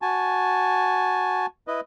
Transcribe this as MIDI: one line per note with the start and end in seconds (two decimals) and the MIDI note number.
0.02 1.46 66
0.02 1.46 80
0.02 1.46 81
1.68 1.80 64
1.68 1.80 71
1.68 1.80 75